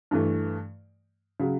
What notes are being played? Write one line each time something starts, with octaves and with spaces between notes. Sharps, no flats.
G2 E3 A3
C#3 F#3